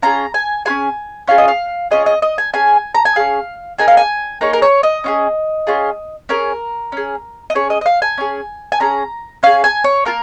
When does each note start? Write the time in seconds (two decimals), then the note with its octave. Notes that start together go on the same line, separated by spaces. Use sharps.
0.02 C#4 F4 G#4 A#5
0.34 G#5
0.65 F4 G#4 G#5
0.70 C#4
1.28 C#4 F4 G#4 F5
1.38 D#5
1.48 F5
1.91 C#4 F4 G#4 D#5
2.06 D#5
2.22 D#5
2.38 G#5
2.53 C#4 G#4 G#5
2.95 A#5
3.05 G#5
3.16 C#4 G#4 F5
3.78 A#3 D#4 G#4 G#5
3.88 F5
3.97 G#5
4.41 A#3 D#4 G#4 C#5
4.53 A#4
4.62 C#5
4.83 D#5
5.04 C#4 F4 G#4
5.67 C#4 F4 G#4
6.29 C#4 G#4 A#4
6.92 C#4 G#4
7.50 D#5
7.55 C#4 G#4 C#5
7.70 D#5
7.81 D#5
7.86 F5
8.02 G#5
8.18 C#4 G#4
8.72 G#5
8.80 C#4 G#4 A#5
9.43 C#4 G#4 F5
9.64 G#5
9.84 C#5
10.05 A#3 F4 A#4